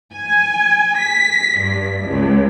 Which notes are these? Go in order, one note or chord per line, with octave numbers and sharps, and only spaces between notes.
G#5
B6
G2
C#2